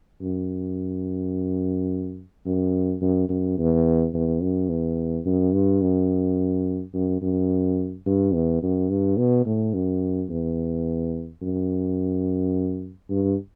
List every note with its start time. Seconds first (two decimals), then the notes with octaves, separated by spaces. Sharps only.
0.21 F#2
2.45 F#2
3.01 F#2
3.29 F#2
3.58 E2
4.14 E2
4.42 F#2
4.69 E2
5.25 F#2
5.53 G2
5.81 F#2
6.94 F#2
7.21 F#2
8.06 G2
8.34 E2
8.62 F#2
8.89 G2
9.17 B2
9.46 A2
9.74 F#2
10.29 E2
11.42 F#2
13.10 G2